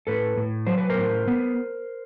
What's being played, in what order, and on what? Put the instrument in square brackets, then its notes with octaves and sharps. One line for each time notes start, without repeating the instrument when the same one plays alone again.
[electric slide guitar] A2 A4 B4
A2
F#3 C5
B4
A#4 C5
A2
B3